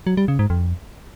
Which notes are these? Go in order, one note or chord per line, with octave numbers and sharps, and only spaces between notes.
F#3
G3
C#3
G#2
F2